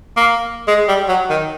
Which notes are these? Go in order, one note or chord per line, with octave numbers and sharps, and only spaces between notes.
A#3
G#3
G3
F#3
D#3